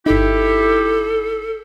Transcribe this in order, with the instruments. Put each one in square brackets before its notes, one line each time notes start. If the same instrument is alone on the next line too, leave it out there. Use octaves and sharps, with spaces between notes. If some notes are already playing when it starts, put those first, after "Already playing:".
[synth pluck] G1 D#4 [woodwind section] E4 G4 [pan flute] A4